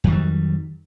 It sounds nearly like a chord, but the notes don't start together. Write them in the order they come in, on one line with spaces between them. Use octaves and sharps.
F2 D#3 G3 F#3